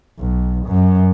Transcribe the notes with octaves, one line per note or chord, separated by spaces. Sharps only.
B1
F#2